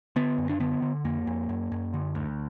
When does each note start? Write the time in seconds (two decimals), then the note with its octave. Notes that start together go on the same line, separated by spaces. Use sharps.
0.16 D3 B3
0.38 F#2
0.49 D4
0.60 D3 B3
0.82 D3
1.05 F2 A#3
1.27 F2
1.49 F#2
1.72 F#2
1.94 D3
2.15 D2